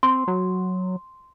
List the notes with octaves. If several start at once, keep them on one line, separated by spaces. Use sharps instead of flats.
C4 C6
F#3